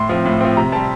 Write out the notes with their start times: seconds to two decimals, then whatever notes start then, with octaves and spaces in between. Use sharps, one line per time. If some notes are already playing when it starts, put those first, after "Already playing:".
Already playing: A2 C6
0.09 F3 C4
0.25 A2
0.41 F3 C4
0.57 C3 A#5
0.72 G3 C4 A5